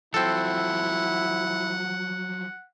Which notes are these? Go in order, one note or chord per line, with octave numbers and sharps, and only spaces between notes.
F3 F#3 C4 E4 A4 F#5